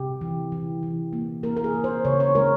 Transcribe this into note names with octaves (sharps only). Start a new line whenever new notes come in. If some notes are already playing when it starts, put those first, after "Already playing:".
Already playing: C3 G4
E3
E3
E3
A#3
A#3 A#4
A#4
G#4
A#3
C5
C#3 C#5
C#5
G#3 A#4